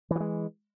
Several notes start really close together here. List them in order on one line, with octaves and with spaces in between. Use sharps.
E3 F3 G#3